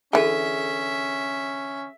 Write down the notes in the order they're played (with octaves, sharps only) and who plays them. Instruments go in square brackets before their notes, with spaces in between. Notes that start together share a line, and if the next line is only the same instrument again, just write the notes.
[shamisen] D3 E3 [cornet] C#4 [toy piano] G#4 A4 [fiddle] E5